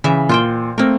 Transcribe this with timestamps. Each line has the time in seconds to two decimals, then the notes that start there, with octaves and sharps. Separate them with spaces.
0.04 C#3 E3 E5
0.29 A#2 F4 C5 G5
0.78 A3 A#3 C4 A#4